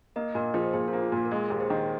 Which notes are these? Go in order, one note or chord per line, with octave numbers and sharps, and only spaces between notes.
A#3 A#4 D#5
A#2 A#4 D#5
F3 G#4 C5
A#2 G#4 C5
F4 A#4
A#3
F4
A#2
F4
A#4
G#3 G#4
D#2
G#4 C5
D#3